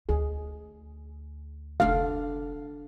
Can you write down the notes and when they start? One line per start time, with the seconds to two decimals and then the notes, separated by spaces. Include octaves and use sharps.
0.09 D2 G#4
1.80 F1 D3 D4 F5